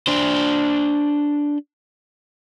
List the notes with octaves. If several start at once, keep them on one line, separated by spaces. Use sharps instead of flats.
D4 C5